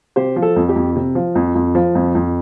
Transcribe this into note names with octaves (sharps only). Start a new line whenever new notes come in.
C3 G4 C5
F3
A4
F2
G4
F2
C3
F3
F2
F2
F3
F2
F2